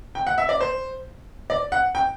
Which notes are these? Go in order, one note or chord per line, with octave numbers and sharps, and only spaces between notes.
G5
F#5
E5
D5
C5
D5
F#5
G5